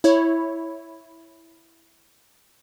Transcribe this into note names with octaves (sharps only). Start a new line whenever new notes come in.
E4 C#5